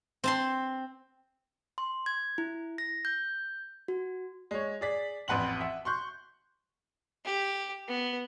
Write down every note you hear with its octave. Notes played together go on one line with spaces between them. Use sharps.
C4 A5 C6
C6
G#6
E4
A#6
G6
F#4
G#3 C#5
G#4 D5 B6
A1 F2 B4 F#5 C6 F#7
E5 F#5
C6 C#6 F#6 G6
G4
B3